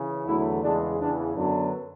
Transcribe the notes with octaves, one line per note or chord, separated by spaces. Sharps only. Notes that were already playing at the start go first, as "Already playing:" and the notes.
Already playing: C#3 E3
E2 D3 F#3 A3 E4
E2 C#3 G#3 D4
E2 C#3 E3 D4
F#2 D3 F#3 B3 D4